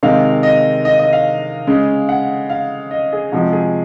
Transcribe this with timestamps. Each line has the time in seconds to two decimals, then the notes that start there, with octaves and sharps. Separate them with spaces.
0.03 C3 D#3 G#3 F5
0.43 D#5
0.85 D#5
0.99 D#5
1.13 F5
1.67 C#3 G#3
2.09 F#5
2.50 F5
2.91 D#5
3.13 G#4
3.32 C3 F3 G#3 F#4
3.53 G#4